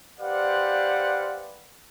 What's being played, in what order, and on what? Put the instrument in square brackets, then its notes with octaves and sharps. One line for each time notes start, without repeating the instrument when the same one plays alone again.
[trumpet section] G4 B4 C5 D5 F5 F#5